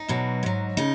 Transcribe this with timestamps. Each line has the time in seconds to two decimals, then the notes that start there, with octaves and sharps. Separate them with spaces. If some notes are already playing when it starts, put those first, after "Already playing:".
Already playing: D#4
0.08 E2 B2 F#3
0.43 G#2 F#3
0.77 C#3 D#4